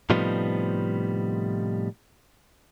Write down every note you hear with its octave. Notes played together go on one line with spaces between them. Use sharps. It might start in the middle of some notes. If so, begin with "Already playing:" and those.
A2 C3 F3 G3 B3 D#4